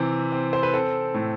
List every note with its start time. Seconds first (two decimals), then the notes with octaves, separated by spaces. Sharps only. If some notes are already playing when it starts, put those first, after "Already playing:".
Already playing: C3 E3 C4
0.32 C4
0.53 C5
0.63 B4
0.73 C4 A4
1.14 A2